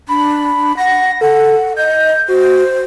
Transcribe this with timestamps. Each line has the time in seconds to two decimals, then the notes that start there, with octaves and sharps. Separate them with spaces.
0.09 D4 B5
0.77 F#5 A#6
1.21 A4 F#5
1.76 D#5 G6
2.28 F#4 C5